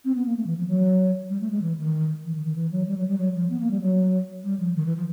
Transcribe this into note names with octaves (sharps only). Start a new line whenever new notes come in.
C4
B3
A#3
A3
E3
F3
F#3
G3
A3
G#3
E3
D#3
E3
D#3
D#3
E3
F#3
G3
F#3
G3
F#3
F3
B3
A#3
G3
F#3
G3
F3
D#3
E3
F3